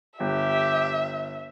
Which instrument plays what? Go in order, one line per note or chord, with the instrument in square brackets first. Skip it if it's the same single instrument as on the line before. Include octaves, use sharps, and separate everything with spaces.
[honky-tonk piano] G1 [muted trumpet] G4 [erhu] E5